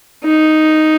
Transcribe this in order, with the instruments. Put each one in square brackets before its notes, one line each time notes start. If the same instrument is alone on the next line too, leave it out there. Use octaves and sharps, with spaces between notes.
[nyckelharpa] D#4